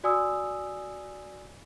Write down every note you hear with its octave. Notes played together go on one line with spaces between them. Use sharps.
F#4 D5 G#5 D#6 E6